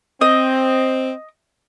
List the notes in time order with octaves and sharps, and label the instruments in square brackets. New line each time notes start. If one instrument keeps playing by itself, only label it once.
[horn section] C4 [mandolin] D#5